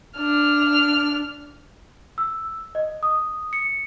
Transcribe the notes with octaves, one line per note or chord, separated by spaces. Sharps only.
D4 F6
E6
D#5
D#6
C#7